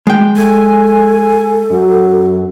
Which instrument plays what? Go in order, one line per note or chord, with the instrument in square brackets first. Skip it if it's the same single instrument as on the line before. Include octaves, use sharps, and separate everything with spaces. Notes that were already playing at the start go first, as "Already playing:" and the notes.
[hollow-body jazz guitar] G#3 G5
[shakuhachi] A4 [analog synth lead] G#5
[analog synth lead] F#2 [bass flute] F#3